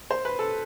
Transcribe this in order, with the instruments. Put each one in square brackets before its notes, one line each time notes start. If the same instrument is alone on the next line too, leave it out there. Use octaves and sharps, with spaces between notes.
[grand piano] C5
B4
A4